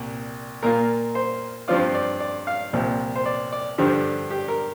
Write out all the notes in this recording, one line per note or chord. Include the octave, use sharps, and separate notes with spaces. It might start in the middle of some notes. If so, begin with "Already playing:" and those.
Already playing: C2 A#2
A#2 A#3 F4 A#4
C5
G2 F3 C4 F4 D5
D5
D5
F5
C2 A#2 F3
C5
D5
D5
G2 D3 F3 D4 G4
G4
A#4